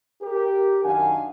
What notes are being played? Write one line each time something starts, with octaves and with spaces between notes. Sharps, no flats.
G4 A#4
F#2 D#3 D4 F5 F#5 G#5